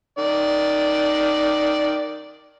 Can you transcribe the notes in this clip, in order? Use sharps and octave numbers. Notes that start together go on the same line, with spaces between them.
D#3 D5